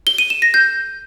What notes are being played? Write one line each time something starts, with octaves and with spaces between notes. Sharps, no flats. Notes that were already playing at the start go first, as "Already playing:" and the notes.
G7
D#7
E7
A#6
G6